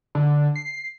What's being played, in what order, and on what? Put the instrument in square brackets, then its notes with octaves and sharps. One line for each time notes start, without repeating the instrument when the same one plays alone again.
[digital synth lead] D3
C7